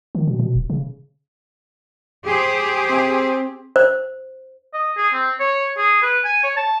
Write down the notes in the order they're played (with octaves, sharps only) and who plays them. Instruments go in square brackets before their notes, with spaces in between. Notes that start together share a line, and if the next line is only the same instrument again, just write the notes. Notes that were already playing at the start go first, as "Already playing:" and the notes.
[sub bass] D#3
B2
B2
D1
C#3
[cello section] G4 G#4 C5
[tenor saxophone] C4
[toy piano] C5
[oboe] D#5
G#4
C4
C#5
G#4
B4
G#5
C#5
A5